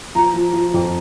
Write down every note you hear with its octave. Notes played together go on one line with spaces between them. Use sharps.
F3 A#5
F3
F3
F2